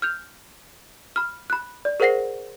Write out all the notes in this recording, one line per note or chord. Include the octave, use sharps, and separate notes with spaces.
F6 G6 F7
B5 F6
B5 F#6
D5
G#4 A#4 C5 F#5 A#6 C7